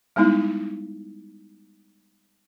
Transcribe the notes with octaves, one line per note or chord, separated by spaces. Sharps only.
G3 G#3 B3 D#4 E4